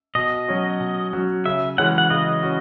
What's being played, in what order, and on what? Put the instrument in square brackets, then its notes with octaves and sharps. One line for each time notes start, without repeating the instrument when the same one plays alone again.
[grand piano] B2 [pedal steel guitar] D#5
[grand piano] F#3 C#4 F#4
B2
F#3 C#4 F#4
[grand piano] C#3 [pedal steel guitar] E5
[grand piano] E3 G#3 C#4 F#4 [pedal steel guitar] F#5
[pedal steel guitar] F#5
[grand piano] C#3 [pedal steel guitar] D#5
[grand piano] C#4 F#4